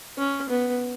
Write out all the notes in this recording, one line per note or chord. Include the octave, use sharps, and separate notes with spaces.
C#4
B3